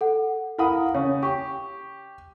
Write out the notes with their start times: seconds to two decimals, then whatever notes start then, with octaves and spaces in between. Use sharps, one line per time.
0.01 A4 F#5
0.58 E4 A#4 F5 F#5 B5 D#6
0.95 C#3 C#5
1.23 G4 C#6